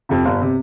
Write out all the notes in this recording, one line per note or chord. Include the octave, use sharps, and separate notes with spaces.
F2 C3
G1
C3